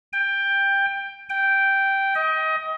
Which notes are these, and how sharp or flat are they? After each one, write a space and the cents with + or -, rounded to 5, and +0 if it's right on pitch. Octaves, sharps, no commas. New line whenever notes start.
G5 +15
G5 -5
D#5 +25